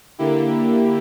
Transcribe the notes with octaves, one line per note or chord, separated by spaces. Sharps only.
D3 A#3 E4 G4